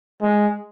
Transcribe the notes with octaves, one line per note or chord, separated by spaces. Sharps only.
G#3